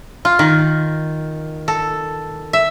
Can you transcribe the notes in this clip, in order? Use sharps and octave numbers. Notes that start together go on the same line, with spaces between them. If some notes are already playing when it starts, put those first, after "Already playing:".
F4
D#3
A4
E5